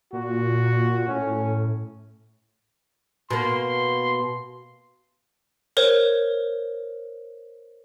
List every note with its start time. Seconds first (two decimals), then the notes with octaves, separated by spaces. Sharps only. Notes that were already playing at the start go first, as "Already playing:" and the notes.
0.13 A#2 F#4
1.07 A2 C#4
3.30 B2 A#3 C6
5.77 A#4 C5 C#5